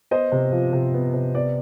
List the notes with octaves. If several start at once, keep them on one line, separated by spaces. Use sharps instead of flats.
B3 C5 D#5
C3
F3
C3
B3
C3
B3 D5